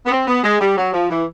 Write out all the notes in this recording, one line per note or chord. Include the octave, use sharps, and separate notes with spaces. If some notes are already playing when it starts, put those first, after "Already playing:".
B3
C4
B3
G#3
G3
F#3
F3
E3